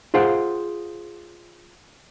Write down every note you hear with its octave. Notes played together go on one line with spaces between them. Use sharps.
F4 G#4 C5 F5 F#5